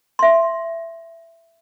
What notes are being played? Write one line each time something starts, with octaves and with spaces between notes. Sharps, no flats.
E5 C6